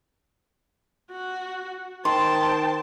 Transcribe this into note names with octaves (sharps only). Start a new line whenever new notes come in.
F#4
D#3 C5 G5 A5 C6